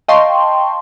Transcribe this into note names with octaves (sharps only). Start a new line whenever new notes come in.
D#5 F5 G5 A5 C6 C#6